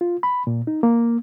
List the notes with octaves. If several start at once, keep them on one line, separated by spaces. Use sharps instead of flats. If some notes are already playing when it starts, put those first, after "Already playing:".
F4
B5
A#2
D#4
A#3